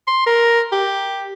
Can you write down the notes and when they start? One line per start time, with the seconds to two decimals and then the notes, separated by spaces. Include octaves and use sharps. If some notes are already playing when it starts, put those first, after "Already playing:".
0.07 C6
0.27 A#4
0.72 G4